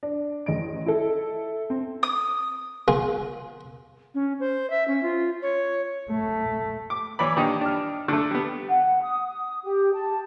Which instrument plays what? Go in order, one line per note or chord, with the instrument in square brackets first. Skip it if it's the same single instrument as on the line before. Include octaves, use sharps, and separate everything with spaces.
[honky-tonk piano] D4
A1 D#5 D7
E4 A4
C4
[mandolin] D#6
[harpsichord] A#3 F4 G#4
[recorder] C#4
C5
E5
C#4
F4
C#5
[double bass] A3
[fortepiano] D6
E3 C#5 D5 B5
A#2 D#3 G3 D4 D#4 G4
D4 F6
D3 A3
G3 B3
[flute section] F#5
D#6
D#6
G4
A5